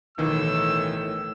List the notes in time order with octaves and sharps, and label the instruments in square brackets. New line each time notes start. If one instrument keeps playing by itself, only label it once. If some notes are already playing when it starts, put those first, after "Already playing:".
[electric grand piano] B1 D#3 E3 [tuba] A2 [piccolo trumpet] E6